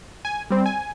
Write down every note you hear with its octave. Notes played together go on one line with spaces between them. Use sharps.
G#5
G3 C4
G#5